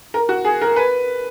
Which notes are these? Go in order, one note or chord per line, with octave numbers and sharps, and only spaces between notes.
A#4
F#4
G#4
A#4
B4